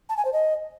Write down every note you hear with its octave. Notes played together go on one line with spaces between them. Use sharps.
A5
G#5
C5
D#5